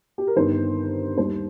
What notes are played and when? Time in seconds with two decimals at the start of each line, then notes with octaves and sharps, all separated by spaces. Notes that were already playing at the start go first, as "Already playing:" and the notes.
0.18 G4
0.27 A#4
0.36 G1 G2 D#3 C4 D#4 C5
1.17 D#2 D#3 G3 D#4 C5